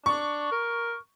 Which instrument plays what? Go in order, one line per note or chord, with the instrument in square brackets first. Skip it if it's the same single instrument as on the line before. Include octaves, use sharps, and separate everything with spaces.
[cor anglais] D4 [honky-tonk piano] C#6
[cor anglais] A#4